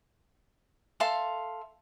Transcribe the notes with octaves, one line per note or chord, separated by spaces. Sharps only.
A4 E5 F5 C6